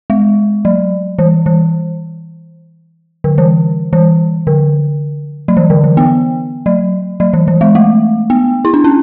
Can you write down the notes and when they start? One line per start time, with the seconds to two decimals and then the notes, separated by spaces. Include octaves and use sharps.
0.10 G#3
0.65 F#3
1.19 E3
1.46 E3
3.24 D3
3.38 E3
3.93 E3
4.47 D3
5.48 F#3
5.57 E3
5.70 D3
5.84 E3
5.97 B3
6.66 F#3
7.20 F#3
7.33 E3
7.48 E3
7.61 G#3
7.75 A3
8.30 B3
8.65 E4
8.74 D4
8.84 C#4